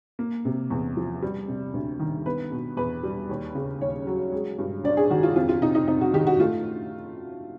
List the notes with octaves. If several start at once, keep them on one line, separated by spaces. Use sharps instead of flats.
A#3
C3
E2
F3
G3
C3
D2
D#3
B3 B4
B2
E2 B4
G3
D#2
C#3
D#2 C#5
F#3
G#3
G2
G1 D5
G#4
D#3 F#4
F4
F2 F4
F4
C3 D#4
D#4
F2 D#4
F#4
D#3 G4
F#4
A3 F4